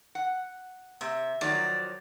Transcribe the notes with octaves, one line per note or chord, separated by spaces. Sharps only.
F#5
C3 E5
D#3 F3 F#3 D5